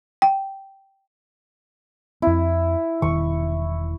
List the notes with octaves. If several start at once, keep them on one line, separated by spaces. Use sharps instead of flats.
G5
F2 C4 E4
E1 E2 D#3 C#6